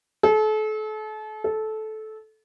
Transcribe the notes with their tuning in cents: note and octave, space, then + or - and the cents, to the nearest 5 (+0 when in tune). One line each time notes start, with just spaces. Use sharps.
A4 -35
A4 -15